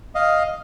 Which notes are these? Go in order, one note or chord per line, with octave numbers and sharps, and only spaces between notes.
D#5 F5